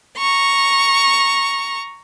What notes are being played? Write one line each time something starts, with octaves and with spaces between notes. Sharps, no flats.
A#5 C#6